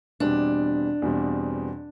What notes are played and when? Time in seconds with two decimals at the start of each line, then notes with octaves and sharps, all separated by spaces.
0.20 E2 B2 G3 C4 D4
1.02 E2 B2 G3 C4